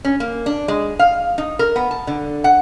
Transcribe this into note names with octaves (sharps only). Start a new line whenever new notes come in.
C#4
A#3
D4
G#3
F5
D#4
A#4
B3
A5
D3
F#5